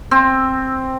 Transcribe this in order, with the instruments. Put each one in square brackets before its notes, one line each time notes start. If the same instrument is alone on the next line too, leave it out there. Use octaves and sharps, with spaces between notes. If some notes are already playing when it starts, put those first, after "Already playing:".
[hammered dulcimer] C4